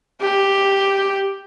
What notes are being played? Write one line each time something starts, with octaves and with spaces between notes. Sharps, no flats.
G4